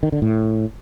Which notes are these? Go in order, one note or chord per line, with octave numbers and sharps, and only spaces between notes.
D#3
D3
A2